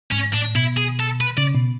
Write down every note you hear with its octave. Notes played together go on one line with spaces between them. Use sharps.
G#2 C#4
A2 D4
B2 E4
G#4
A4
B4
C#3 D5
B2